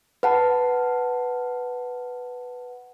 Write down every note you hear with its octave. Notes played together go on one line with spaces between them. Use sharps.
B4 F#5 A5